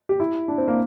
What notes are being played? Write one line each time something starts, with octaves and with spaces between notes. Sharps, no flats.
G4
E4
D4
C4
A#3